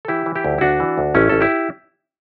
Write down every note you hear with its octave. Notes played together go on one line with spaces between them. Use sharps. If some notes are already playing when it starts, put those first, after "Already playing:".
A4
E3 E4 G4
E3
E4 G4
D2
E4
D2 D4 F#4
E3
D2
A1 C#4 E4
A1 A4
E4 G4